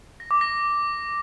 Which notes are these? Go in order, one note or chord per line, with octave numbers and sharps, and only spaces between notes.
A#6
D6
A#6